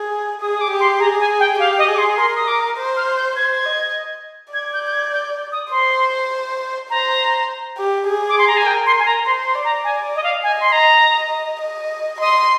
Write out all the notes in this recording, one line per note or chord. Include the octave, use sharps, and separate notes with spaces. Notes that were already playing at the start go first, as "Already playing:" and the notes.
Already playing: G#4
G#4 D#6
D#6
D6
G4
C6
G#4 A#5
G#5
G5
G4 F5
D#5
G#4
D6
C6
A#4 C6
D#6
D6
C5
F6
G6
C5 G#6
G#6
D#5
D5 G#6
G6
G6
G#6
G6
D#6
C5 C6
C5 A#5
G4
G#4
D6
C6
A#5
G#5
A#4 G5
C6
G#5
A#5
C5 C6
C6
D5
A#5
G#5
D#5
F5
D#5 G#5
C6
D#5 A#5
D#5
D#5
D#5 C6